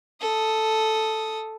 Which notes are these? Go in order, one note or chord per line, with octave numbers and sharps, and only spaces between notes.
A4 D#6